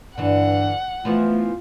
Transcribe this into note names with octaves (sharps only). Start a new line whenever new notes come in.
G2 D3 E3 F#5
E3 F3 A3 B3 F4